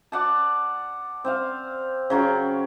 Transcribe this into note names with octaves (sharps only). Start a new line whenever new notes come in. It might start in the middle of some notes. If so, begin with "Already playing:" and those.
D5 F#5 A5
C4 C5 F5
C#3 F#3 F4 G5